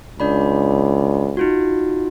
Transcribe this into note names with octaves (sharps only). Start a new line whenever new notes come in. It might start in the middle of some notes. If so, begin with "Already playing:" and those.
C#2 D4 D5 B5
D#4 F4 F#4